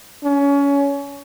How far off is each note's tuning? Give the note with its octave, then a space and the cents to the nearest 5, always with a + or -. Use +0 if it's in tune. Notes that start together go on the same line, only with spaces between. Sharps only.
C#4 +25